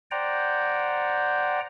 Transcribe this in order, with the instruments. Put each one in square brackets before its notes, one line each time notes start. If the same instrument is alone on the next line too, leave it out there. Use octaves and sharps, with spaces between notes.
[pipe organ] C5 D5 F#5 G5 A#5